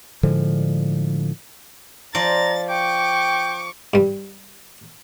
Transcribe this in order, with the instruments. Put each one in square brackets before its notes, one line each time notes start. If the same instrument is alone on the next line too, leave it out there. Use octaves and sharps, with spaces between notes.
[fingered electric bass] A2 D3 F3 G#3
[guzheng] F3 D5 [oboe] A#5 [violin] A6
[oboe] G5 [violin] C#6 D6
[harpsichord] G2 G3